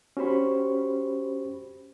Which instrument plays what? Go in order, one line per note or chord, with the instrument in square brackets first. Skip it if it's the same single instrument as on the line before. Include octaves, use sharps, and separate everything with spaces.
[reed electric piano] C#4 F#4 G4 C5 B5 C#6